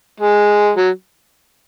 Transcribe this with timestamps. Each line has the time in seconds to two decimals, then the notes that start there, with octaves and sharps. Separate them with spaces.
0.20 G#3
0.77 F#3